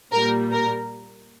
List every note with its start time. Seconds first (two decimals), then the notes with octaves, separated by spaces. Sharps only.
0.12 A#2 G3 A#4
0.53 A#4